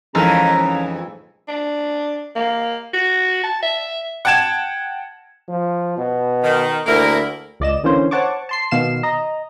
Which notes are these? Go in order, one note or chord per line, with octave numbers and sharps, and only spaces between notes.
F2 C#3 E3 G#3 D#4 A4 A#4 A#5
D4
A#3
F#4
A5
E5
F#5 G5 A5 G#6 E7
F3
B2
D#3
D2 A#3 E4 A#4
C#2 D5 D#5 E7
D3 E3 A#3 C#4 C5
C5 C#5 F#5 A5 C#6 D6
A5 C6 C7
B2 D#3 F5 C7 E7
D#5 A#5